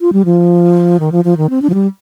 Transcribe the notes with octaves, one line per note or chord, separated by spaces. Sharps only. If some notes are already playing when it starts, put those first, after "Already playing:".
F4
G3
F3
D#3
F3
F3
D#3
C4
D4
F3
G3